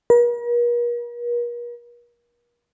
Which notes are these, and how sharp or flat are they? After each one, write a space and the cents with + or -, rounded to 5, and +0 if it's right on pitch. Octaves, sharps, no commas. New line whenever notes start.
A#4 +45